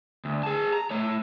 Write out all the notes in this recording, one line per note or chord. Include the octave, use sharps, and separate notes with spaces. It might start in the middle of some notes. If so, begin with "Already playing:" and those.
D2
G#4 A5
A#5
A3 C#5